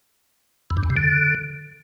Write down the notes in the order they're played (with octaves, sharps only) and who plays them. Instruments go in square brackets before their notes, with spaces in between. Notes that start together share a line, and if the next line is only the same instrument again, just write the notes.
[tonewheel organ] E2
G2
E2
C3
D3